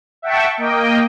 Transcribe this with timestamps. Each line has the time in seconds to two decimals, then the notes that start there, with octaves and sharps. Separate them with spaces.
0.22 E5 F#5 G5 A5 C#6
0.58 A#3 D#5 G5